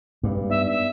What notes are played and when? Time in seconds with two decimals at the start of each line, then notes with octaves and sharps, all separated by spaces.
0.23 G2 G#3 C4
0.50 B3 D#4 D5 E5
0.67 E5